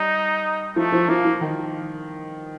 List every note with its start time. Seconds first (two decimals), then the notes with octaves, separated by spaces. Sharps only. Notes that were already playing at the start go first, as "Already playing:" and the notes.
Already playing: G3 D#4
0.76 F3 A3
0.92 F3
1.09 F3 A#3
1.25 F3
1.41 D#3